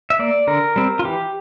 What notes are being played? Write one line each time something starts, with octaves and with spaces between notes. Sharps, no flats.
E5
A#3 D5
D3 A#4
G3 C4
F4
E3 G4